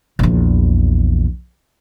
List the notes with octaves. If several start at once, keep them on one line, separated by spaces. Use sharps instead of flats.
A#1 E2